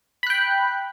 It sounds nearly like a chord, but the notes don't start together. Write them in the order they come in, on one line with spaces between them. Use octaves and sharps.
B5 F#6 G5